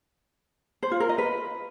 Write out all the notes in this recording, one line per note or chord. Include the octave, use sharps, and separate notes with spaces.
C5
F4
A#4
D#5
B4